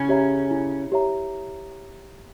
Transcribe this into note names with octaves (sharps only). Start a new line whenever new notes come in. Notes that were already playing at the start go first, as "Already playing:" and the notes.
Already playing: C#3 C#4 E4
G4 C#5 E5 A#5
E4
G4 C#5 E5 A#5